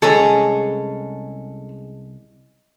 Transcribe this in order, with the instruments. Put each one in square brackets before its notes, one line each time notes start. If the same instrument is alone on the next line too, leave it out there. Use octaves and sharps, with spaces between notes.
[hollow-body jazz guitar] C2 G#4 [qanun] G#3 C#4 B4 [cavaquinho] A4 C#5 A#5